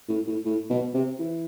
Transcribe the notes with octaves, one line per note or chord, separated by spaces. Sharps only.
A2
A2
A2
B2
C3
E3